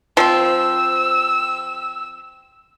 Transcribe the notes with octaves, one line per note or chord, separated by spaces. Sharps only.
F3 C4 E6